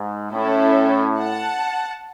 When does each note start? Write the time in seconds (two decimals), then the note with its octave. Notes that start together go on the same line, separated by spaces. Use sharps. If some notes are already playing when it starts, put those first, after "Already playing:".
Already playing: G#2
0.33 A2 C#4 E4 A4
1.18 F#5 A5